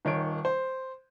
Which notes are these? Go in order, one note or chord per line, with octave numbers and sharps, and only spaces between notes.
D#1 D#3 C#5 D7
C5